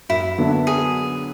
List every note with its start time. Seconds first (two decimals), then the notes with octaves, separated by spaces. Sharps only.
0.09 F#2 E4
0.38 D3 F#3 B3 D4
0.67 G#4